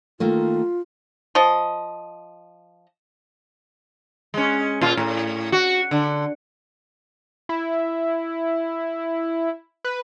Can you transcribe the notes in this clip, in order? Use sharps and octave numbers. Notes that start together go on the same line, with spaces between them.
D#3 A3 A#3 F4
F3 D#5
G#3 C#4
A#2 F4
A2
F#4
D3
E4
B4